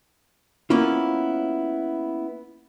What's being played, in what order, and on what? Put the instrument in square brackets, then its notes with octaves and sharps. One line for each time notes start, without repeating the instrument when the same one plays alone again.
[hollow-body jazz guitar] A#3 B3 C#4 E4 F4